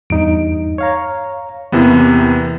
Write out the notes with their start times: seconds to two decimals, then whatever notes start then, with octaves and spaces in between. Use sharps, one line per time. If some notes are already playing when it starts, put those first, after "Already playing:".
0.10 E2 G2 D#4 D7
0.78 C#5 F5 A#5
1.72 E2 C3 E3 A#3 B3 E4